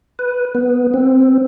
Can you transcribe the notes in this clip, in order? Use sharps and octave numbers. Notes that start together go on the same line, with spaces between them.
B4
B3
C4